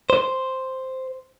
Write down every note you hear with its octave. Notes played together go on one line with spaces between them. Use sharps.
C5